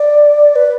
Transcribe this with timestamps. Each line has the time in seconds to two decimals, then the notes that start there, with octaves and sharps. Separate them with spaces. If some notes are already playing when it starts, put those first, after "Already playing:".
Already playing: D5
0.56 B4